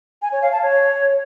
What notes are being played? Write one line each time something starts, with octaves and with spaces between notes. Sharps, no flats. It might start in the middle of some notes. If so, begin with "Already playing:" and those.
G#5
C#5
F5
A5
C#5